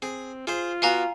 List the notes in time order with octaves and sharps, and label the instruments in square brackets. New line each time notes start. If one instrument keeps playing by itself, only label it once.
[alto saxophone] C4 [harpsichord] G#4
[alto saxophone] F4 [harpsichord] G#4 C5
[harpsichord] B3 F#4 [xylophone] F5 G#5 A#5